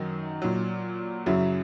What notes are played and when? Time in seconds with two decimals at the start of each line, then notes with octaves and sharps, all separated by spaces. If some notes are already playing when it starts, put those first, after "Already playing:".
Already playing: F#2 D#3 F#3 D#4
0.42 A#2 F#3
1.26 F#2 C#3 F#3 E4